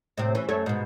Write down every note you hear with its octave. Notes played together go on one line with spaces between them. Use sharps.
A2 C3 C4
E3 C#4
F#2 A3 C#5
G#2 B2